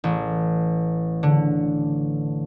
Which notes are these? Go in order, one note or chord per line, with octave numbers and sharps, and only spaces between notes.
A1
D3